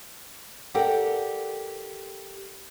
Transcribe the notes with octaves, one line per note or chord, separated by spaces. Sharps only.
G4 A4 A#4 D5 F#5 G5